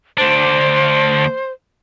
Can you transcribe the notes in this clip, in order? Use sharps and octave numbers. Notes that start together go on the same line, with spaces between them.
D2 D4 C5